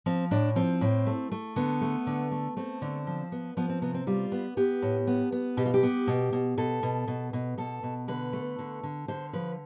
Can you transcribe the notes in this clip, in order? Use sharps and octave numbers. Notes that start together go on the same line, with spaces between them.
F3 C4
A2 D4
F3 C4
A2
A3
A3
D3 B3
A3
D3
A3
A3 C4
D3
F3
B3
F3 B3
C4
C3 B3
C4
G3 F4
B3
B3 G4
A2
B3
B3
B2 G4
F4
G4
B3
B2
B2
B2 A4
B2
B2
B2
B2 A4
B2
D3 B4
A3
D3
D3
D3 C5
F3 B4